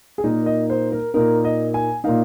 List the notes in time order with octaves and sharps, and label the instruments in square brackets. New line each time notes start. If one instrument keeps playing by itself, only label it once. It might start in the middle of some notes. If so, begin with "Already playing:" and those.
[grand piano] G#4
A#2 A#3 D#4 A#4
D#5
C5
A#4
A#2 A#3 D#4 A#4
D#5
G#5
A#2 A#3 D#4 F5